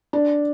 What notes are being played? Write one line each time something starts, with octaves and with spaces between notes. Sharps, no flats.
D4